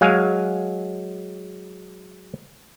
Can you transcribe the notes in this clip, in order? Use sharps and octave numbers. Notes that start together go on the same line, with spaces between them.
F#3 G#3 F5 G#5